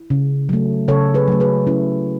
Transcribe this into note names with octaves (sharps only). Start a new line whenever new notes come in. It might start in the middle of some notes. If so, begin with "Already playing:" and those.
Already playing: E4
C#3
F#3 A3
C#3 A4 C#5
G#4 B4
F#3 A3
G#4 B4
C#3 C#4 E4